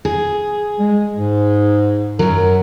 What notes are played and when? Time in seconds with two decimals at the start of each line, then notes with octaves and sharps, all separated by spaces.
0.05 G#4
0.79 G#3
1.16 G#2
2.19 F#2 F#3 A#4